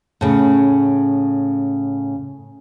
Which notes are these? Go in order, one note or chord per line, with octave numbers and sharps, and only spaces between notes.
A2 C#3